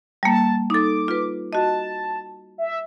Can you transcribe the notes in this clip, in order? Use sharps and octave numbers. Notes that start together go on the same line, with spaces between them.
G3 A#3 A5
D#4 A4 D6
F4 B4
F#4 D#5 A5
E5